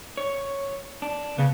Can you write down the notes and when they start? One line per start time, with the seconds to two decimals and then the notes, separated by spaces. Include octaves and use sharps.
0.17 C#5
1.02 D4
1.38 C#3 B3